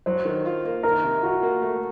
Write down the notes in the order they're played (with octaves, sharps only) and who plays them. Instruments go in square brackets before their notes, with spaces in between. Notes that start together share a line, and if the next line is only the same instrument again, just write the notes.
[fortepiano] F#3 [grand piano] C5
[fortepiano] D#3
F4
A#3
[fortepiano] D#3 [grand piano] A#4
[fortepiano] C3
[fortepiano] F4 [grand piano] F#4
[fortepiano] A#3
A3